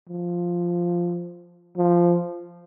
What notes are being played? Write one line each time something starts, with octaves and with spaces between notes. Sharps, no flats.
F3
F3